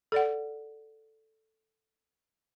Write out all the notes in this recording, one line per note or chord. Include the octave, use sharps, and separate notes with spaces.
A4 D5 F#5